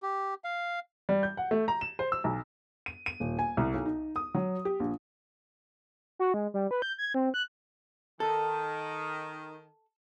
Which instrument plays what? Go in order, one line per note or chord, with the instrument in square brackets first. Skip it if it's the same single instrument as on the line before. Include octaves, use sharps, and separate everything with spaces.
[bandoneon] G4
F5
[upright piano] G3
G6
F#5
A3
A#5
E7
C5
E6
B1
[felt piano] D#7
D#7
D#1
G#5
C2
B1
D#4
D#6
F#3
G4
A#1
[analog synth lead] F#4
G#3
G3
B4
G6
G#6
C4
F#6
[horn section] D#3 [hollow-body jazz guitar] A4